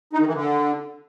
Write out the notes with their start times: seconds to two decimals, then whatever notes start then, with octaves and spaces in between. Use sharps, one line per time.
0.13 D#4
0.20 D#3
0.27 E3
0.34 D3